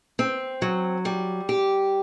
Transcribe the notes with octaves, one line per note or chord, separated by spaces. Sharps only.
C4
F#3
G3
G4